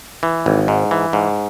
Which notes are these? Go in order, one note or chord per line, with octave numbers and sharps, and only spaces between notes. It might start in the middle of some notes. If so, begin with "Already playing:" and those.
E3
G#1
G#2
E3
G#2